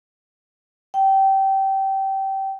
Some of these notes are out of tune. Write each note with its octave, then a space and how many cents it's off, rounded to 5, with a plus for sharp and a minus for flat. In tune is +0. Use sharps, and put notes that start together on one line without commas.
G5 -20